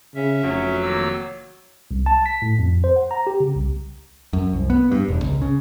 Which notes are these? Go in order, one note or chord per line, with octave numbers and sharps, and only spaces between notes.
C#3 C#4 E5
F1 F#3
D#3 A#3 E6
C2
A5
B6
A2
F2
C5
F#5
A#5
G4
C#3
C2
F#2
C2
B3
G2
E1
C#2
C#3